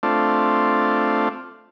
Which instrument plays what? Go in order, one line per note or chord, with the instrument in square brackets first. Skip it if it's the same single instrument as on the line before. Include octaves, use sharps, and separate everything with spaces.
[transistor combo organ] A3 C4 D4 F4